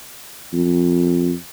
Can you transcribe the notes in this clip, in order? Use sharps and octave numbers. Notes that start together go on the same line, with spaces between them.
F2